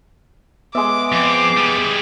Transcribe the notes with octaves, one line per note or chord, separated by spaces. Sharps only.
G#3 B3 E5 D6
F2 C4 D6
G3 G#4